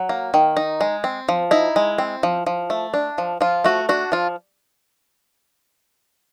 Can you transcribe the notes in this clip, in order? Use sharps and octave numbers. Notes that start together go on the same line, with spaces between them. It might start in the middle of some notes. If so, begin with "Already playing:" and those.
Already playing: F#3
A#3
D#3
D#4
G#3
C4
F3
D#4 E4
G#3
C4
F3
F3
A3
D4
F3
F3 F4
A3 F#4
D4 F#4
F3 F4